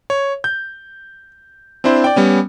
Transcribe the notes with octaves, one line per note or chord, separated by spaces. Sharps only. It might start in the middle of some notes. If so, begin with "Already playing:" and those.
C#5
G6
C4 D4 E4 C5
D5 G5
G3 B3 C#4